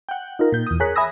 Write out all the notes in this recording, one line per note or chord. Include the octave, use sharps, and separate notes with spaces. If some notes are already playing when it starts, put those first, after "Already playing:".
F#5 G5
D#4 F4 A#4
A#2 G6
E2 D#6
G#4 A#4 C#5 F#6 B6
E5 G#5 B5 D#6 E6 A#6